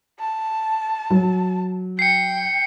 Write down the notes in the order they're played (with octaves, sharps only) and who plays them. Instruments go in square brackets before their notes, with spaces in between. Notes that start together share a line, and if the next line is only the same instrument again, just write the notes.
[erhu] A5
[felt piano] F#3
[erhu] G5 [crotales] C7 C#7